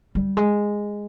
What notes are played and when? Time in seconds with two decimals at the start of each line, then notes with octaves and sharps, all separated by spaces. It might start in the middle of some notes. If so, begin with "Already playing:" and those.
0.15 G3
0.37 G#3